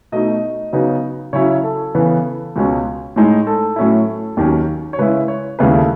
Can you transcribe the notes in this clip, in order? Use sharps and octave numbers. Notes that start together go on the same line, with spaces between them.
B2 A3 D#4 D#5
C#3 F#3 B3 D#4
C#3 F#3 C#4 E4 C#5
A4
C#3 E3 B3
C#2 B2 G#3 C#4
A2 G#3 D#4
A4
A2 F#3 C#4 E4
D#2 D#3 F#3 C#4
C#5
C#3 G#3 C#4 E4 B4
C#5
D#2 C#3 G#3 C#4 E4 B4
A4